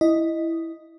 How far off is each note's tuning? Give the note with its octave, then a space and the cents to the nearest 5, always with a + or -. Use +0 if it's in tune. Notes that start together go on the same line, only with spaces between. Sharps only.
E4 +0 D#5 +0